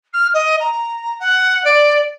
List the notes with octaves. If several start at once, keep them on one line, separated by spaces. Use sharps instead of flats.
F6
D#5
A#5
F#5
D5